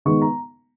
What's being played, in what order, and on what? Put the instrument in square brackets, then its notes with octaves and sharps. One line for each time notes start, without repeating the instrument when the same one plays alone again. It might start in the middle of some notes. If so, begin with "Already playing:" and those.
[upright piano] D#3 G#3 B3 C#6
A#5